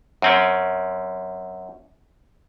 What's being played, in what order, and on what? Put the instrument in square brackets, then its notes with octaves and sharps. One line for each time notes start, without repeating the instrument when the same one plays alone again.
[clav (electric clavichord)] F#2 C4 C#4